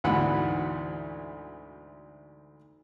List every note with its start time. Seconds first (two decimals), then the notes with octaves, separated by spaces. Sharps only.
0.04 D2 G#2 B2 E3 F#5 B5